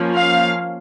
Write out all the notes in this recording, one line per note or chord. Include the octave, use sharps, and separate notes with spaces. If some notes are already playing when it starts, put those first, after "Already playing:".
Already playing: F3 A#3 C#4
F5